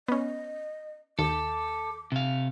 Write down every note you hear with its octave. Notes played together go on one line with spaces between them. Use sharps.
B3 C#4 D#5
D#2 A4 D6
C3 F5